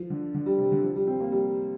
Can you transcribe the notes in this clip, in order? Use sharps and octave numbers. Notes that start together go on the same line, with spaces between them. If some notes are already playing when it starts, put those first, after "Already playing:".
Already playing: F3
D3
D3
G3
C3
D3
F3
G3
C4
A#3
G3